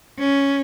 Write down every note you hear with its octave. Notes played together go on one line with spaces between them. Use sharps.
C#4